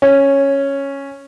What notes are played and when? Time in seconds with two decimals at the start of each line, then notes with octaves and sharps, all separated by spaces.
0.02 C#4